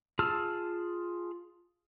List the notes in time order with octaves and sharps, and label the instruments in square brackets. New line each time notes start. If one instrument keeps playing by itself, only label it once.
[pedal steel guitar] F4 G#4 A5 E6 F6